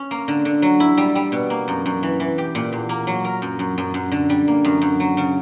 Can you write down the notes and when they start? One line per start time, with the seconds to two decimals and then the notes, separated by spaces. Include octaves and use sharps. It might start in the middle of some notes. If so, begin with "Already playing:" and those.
Already playing: C#4
0.11 A#3
0.28 D3
0.45 D3
0.62 F#3
0.80 E4
0.98 G3
1.15 G3
1.32 B2
1.50 A#3
1.68 F#2
1.86 F#2
2.03 E3
2.20 E3
2.38 G4
2.55 A#2
2.73 E2
2.89 A#3
3.07 F#3
3.25 A#4
3.42 F#2
3.59 F#2
3.78 F#2
3.94 F#2
4.12 D3
4.29 G3
4.48 A#3
4.65 F#2
4.81 F#2
5.00 F#3
5.17 C#3